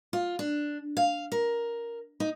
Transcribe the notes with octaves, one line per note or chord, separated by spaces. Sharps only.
F4
D4
F5
A#4
D#4